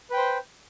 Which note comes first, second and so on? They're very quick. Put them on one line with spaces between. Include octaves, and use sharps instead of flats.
B4 G5 C5